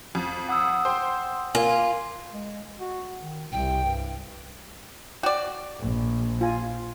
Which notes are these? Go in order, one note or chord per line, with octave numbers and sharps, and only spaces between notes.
F2
F#5 D#6 E6
C5 G5
A#3 F4 G#5
G#3
F#4
D#3
C2 C3 G5
G2
F#4 D5 G5
A#1
F4 G#5